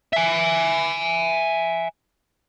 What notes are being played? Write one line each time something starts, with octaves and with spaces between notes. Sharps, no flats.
E5 G#5